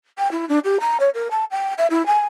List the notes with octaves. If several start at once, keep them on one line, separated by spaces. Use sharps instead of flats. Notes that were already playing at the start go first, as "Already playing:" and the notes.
G5
E4
D4
G4
A#5
C#5
A#4
A5
G5
E5
E4
G#5